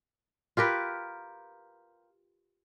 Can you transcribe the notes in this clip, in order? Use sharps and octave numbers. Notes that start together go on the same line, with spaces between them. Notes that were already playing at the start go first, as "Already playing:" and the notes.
F4 G4 A#4 B4